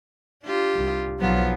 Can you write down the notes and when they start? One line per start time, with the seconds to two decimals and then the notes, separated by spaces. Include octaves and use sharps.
0.44 D4 F4 G4
0.75 C2
1.19 B1 F3 F#3 B3 F4